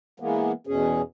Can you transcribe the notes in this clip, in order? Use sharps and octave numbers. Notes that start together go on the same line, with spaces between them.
E3 G#3 A#3 B3
E2 B2 C#4 G#4